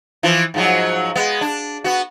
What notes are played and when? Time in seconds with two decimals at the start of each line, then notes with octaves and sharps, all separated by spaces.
0.23 E3 F3 F4
0.54 G#2 F3 F#3
1.15 G#3 B3
1.41 D4
1.84 B3 F#4